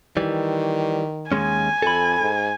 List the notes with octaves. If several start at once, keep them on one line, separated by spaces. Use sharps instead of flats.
D#3 E3 G3
D#2 G#3 C#4 G#5
F2 A4 B5
G#2